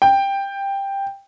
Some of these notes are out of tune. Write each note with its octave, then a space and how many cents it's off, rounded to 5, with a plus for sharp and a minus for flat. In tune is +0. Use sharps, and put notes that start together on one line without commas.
G5 +10